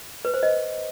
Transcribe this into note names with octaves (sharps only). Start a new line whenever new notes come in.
B4
C5
D#5